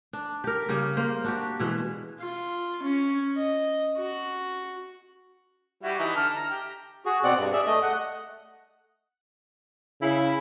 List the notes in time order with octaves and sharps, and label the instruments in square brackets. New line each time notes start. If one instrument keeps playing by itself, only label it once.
[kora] D4
G4 A#4
C#3 G3 A#3 G4
A#3 C5
D4 F#4 G4
B2 E3 G#3
[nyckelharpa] F4
C#4
D#5
F#4
[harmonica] G3 E4 F#4
E3 D#4 E4
D3 A4 F6
A#5
G4
[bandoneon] F#4 G#4
B2 C4 D5 F#5 F#6
G2
G#4 D5 E5
A3 D#5
F#5
[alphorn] C#3 [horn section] E4